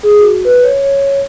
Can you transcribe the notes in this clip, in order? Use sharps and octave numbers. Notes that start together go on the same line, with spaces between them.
G#4
F#4
B4
C#5
C#5